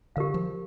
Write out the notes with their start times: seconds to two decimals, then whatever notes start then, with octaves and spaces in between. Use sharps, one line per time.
0.16 D3 G4 A#4 F5
0.34 F3